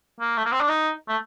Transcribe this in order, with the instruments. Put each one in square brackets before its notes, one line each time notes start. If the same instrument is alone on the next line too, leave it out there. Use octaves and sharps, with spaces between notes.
[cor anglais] A#3
A3
A#3
C4
D4
D#4
A3